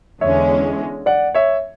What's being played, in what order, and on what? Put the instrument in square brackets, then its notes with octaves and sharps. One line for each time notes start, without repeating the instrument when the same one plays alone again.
[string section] E2 D3 G#3 C#4 [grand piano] C#5 E5
[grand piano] D5 F#5
C#5 E5